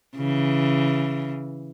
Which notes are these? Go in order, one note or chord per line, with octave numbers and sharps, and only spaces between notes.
C#3 E3